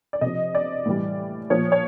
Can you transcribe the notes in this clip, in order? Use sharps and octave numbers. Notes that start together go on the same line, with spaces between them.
D5
C3 F3 D#5
D5
A2 E3 G3
A#2 F3 C#5
C#5